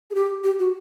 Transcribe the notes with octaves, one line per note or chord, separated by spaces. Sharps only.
G#4
G4
G4
F#4